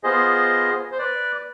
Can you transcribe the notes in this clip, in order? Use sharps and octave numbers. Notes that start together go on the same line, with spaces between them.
B3 F4 G#4 C5 D#5
C5
B4 D5